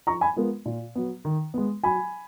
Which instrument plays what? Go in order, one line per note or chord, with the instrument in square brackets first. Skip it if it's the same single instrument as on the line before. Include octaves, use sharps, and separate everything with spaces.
[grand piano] F3 [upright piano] A#5 C#6
[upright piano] G#5 B5
[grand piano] G#3 B3 F4 A#4
A#2
F#3 B3
D#3
G#3 B3
[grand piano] F#3 [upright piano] G#5 B5